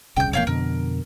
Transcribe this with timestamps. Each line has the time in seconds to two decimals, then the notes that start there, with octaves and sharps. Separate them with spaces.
0.17 D#1 C2 C#3 G5 G6
0.33 E1 F2 A#3 C#5 F5 G5
0.47 F2 B2 D3 A#4